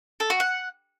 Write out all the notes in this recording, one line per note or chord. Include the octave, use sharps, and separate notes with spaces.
A4
F#4
F#5